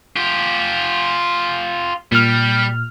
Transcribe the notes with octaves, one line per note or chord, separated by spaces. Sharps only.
F4 G4
A#2 G3 F6